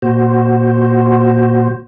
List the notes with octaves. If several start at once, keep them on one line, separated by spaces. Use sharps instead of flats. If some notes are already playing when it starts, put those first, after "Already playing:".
A#2 F#4 C5